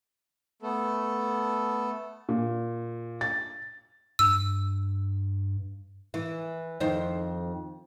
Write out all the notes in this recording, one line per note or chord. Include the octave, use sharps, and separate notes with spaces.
A3 B3 A4
A#2
A6
G2 E6
E3
F2 D#3 C5